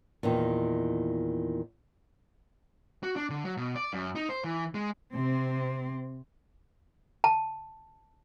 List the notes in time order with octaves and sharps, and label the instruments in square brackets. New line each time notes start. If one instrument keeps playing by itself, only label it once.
[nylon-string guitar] E2 A#2 D#3
[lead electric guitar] F#4
D4
D3
F#3
B2
D5
F#2
D#4
C5
E3
G#3
[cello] C3 C4
[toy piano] A5